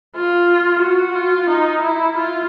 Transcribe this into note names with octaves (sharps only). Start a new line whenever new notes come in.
F4
F#4
F4
D#4
E4
F4